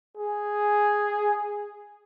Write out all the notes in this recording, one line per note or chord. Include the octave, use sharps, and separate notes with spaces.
G#4